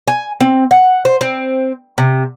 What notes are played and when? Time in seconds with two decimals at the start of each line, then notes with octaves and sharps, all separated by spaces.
0.08 G#5
0.40 C4
0.71 F#5
1.05 C5
1.21 C4
1.98 C3